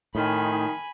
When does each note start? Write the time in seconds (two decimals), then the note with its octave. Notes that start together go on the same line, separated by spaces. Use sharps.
0.15 F2 A2 D#3 D#4 G#5 B5